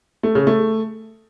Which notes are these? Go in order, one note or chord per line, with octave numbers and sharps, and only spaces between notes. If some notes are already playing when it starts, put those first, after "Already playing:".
A3
C#3
A3